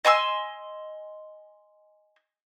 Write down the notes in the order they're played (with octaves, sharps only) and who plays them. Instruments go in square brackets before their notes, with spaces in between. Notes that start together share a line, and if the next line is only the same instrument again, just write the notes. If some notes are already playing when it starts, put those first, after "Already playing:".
[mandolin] D#5 G#5 C6 E6